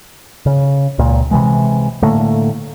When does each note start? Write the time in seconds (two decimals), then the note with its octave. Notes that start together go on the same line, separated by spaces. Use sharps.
0.46 C#3
0.99 C#2 A#2
1.31 C3 E3 G#3
2.02 A2 D3 A3 A#3